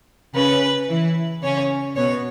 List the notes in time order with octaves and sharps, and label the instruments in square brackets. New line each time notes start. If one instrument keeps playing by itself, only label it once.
[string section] C#3 C#4 [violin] B4
[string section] E3 E4
[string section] C#3 C#4 [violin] C#5
[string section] B2 B3 [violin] C#5